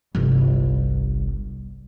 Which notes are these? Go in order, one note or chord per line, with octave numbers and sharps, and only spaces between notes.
G1 C2